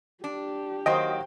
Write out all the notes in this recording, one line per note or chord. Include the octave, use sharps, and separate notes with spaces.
D4 G4
D#3 F#3 A#3 C5 D#5 G5